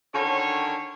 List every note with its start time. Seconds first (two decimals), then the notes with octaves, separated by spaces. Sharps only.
0.15 D3 D#3 C#4 F#4 C#5